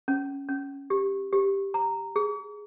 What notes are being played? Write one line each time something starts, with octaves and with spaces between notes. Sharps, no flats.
C#4
C#4
G4
G4
A#5
G#4